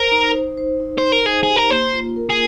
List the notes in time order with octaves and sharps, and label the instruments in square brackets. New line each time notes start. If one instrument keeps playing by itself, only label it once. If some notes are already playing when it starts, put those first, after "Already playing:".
Already playing: [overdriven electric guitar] A#4 [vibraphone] C5
[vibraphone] D#4
C5
C5
D#4
[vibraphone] D#4 [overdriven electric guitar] C5
[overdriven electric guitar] A#4
[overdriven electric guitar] G#4 [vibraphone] D#5
[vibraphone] G4 [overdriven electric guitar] G#4
[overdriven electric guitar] A#4
[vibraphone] A#3 [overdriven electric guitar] C5
[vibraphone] F4
A#4
[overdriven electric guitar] G#4